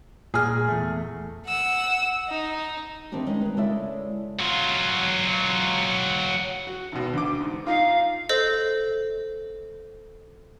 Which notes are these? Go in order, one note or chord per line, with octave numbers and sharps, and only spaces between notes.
A#2 G#4 F6
E2 A3
F#5 E6
D#4
D#3 E3 G3 C4 D4 G4
G3 G#3 C#4 D#4
D#3 B4
C#3 G#3 E4 A4 D5 E5
F#3 F4
F#4
G#1 B2
D2 D3 D6
G#2
D#4 F4 F5
A4 C5 D#5